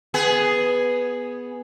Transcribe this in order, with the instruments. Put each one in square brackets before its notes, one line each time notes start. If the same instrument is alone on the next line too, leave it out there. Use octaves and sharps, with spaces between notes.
[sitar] B3 G#4